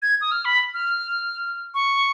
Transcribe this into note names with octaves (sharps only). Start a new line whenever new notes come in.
G#6
D#6
F6
B5
F6
C#6